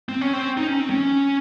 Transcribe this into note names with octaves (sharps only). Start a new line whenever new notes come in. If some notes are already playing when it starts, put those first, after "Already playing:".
C4
C#4
C4
D#4
C#4
C4
C#4